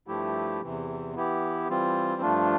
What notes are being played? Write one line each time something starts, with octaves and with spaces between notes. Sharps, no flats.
G2 F3 A3 E4 G4
E2 C3 E3
E3 B3 E4 G4
E3 G3 C4 F4
G2 F3 A3 D4 F4